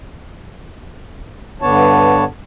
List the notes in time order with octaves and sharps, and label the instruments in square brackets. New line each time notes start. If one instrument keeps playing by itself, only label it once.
[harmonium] G2 D3 B3 D4 C#5 A5